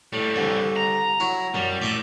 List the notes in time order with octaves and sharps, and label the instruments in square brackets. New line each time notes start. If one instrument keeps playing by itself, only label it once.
[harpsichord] A2 [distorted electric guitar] E3 G3
[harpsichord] C2 D3
[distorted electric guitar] A#5
[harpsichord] F#3 E4 F#4
[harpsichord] F#2 [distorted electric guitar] G3
[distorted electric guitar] A2 [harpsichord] D5 E5 C6